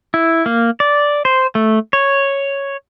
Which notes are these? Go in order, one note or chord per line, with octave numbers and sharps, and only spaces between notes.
E4
A#3
D5
C5
A3
C#5